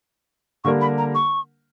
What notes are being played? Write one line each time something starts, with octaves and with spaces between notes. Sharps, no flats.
D3 G3 A#3 D4 A#4 C#6
B5
A#5
C#6